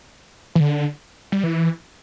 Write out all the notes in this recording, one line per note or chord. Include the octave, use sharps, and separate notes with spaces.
E3
D3
G3
E3